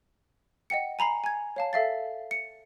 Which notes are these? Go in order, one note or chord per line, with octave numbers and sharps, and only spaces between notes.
D#5 F#5 G5 C#7
G#5 A#5 B5 C7
G#5 G#6
C#5 F5 A5
A4 E5 F5 A6
C#7